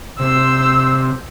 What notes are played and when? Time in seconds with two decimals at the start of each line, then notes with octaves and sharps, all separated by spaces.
0.19 C3 C5 E6